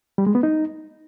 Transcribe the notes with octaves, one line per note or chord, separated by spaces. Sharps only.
G3
G#3
B3
D#4